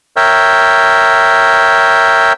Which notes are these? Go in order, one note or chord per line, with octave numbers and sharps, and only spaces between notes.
A#4 C#5 E5 G5